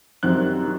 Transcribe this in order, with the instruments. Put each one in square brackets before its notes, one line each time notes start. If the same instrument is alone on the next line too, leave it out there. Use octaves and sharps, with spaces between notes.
[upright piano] F#2 D#3 G3 C4 F#6
D#3